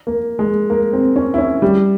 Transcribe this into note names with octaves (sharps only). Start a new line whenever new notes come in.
A#3
G#3
A#3
C4
C#4
E4
C#4
G3